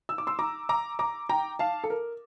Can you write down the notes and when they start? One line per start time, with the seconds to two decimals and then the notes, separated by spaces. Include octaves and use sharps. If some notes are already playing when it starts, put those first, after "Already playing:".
0.09 E6
0.18 D6
0.27 C6 E6
0.39 A#5 D6
0.69 A#5 D6
0.99 A#5 D6
1.29 G5 A#5
1.59 F5 A5
1.84 A4
1.90 A#4